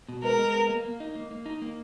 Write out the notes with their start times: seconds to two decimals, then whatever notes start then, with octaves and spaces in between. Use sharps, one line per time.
0.09 B2
0.23 G#3 A#4
0.39 G#3
0.54 B3
0.70 A#3
0.85 A#3
1.00 D#4
1.15 A#3
1.31 A#3
1.46 D#4
1.62 A#3